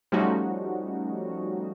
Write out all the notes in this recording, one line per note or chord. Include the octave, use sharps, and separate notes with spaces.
F3 G3 A3 C#4 D#4 F#4